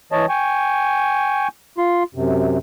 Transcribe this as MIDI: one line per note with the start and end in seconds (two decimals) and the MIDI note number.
0.12 0.26 52
0.12 0.26 73
0.12 0.26 75
0.12 0.26 81
0.29 1.48 79
0.29 1.48 80
0.29 1.48 85
1.78 2.03 65
1.78 2.03 84
2.15 2.58 42
2.15 2.58 48